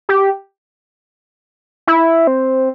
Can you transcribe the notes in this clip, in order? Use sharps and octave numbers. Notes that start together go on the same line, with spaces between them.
G4
E4
C4